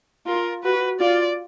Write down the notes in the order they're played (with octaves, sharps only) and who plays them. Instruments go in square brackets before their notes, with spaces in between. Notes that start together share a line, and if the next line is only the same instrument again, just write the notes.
[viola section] F4 [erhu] A#4
[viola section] F#4 [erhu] B4
[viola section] F4 [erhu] D5